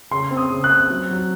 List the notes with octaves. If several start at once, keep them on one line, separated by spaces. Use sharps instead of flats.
C#3 C6
C4
D#6
C#3
F#6
C4
F#3
F#3